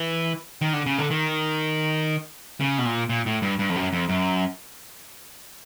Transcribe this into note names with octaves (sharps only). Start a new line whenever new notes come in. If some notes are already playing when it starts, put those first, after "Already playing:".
Already playing: E3
D#3
D3
C#3
D3
D#3
C#3
B2
A#2
A#2
A2
G2
G2
F2
F#2
F2
F#2